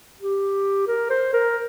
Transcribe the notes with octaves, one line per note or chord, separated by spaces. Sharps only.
G4
A#4
C5
A#4